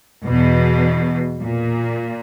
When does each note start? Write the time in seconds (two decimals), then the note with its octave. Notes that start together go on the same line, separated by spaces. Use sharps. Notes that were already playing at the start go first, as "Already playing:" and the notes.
0.23 E2 B2
1.40 A#2